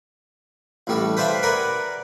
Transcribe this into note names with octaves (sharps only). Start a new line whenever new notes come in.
A1 A2 G3 A4
B4 C5 D5 E5 F5 G5
A#4 B4 D5 F#5 G#5